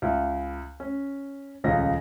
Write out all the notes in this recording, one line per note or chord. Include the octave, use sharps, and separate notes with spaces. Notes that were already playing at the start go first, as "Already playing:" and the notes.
C#2 E5
C#4
D#1 C#2 C#3 D#5 A#6